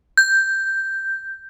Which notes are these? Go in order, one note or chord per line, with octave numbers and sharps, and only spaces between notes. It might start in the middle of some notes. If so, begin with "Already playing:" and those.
G6